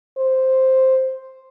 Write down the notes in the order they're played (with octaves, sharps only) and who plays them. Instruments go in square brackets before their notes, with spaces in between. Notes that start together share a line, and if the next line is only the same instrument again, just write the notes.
[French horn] C5